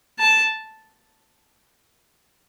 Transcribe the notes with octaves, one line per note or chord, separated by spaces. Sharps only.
A5